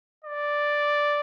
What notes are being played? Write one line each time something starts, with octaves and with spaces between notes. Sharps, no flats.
D5